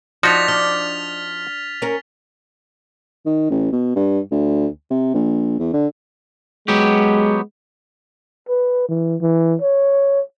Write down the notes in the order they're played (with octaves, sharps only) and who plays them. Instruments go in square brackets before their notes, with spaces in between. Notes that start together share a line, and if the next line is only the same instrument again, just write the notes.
[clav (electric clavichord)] F3 D#4 F#4 [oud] D4 [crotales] A6 B6 F7
[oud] D4 [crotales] F6
[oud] C#4 A#4
[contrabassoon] D#3
A1
B2
G2
D2
C3
A#1
E2
D3
[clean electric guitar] F#3 B3 G4 [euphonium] G#3
[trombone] B4
E3
E3
C#5